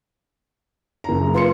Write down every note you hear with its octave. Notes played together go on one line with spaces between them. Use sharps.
F#1 A#5
F4 B4 C6 C#7